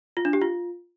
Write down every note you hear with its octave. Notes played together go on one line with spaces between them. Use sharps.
F4
D4
G4
F4